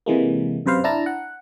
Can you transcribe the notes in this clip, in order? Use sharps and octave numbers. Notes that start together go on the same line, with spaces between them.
C3 E3 G#3 A#3
F#2 C3 B4 C5 F5
D4 E4 A5 A#5
F#5